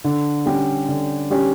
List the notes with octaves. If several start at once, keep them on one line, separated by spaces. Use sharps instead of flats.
D3
G3 C#4 G4
D3
G3 C#4 G4